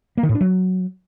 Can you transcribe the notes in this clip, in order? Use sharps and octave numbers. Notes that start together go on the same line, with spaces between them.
A#3
D#3
A2
D4
F#3